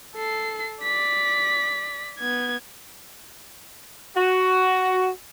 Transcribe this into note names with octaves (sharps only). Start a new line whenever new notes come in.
A4 C7
D5 B6
B3 G#6
F#4